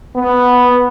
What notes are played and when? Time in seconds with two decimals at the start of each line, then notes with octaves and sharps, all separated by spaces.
0.15 B3